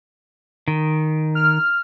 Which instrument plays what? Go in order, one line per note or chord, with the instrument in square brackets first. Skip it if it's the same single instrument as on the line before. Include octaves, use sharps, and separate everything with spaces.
[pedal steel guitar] D#3
[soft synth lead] F6